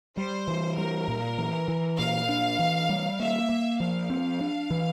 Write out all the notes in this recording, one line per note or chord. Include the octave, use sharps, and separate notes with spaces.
G3 C5
E3
G3 A#4
A#2
E3
E3
A#2 F5
D4
E3
G3
A#3 E5
A#3
F3 F5
C4
D4
E3